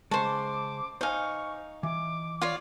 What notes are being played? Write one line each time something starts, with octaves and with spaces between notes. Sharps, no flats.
C#3 G#3 C5 A5 C#6
D6
D#4 C5 F5 G#5 C#6
E3 D6
F4 C#5 D5